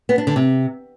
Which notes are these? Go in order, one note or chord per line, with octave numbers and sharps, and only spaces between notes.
B3
D4
D3
C3